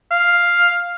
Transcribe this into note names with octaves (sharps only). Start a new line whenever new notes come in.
F5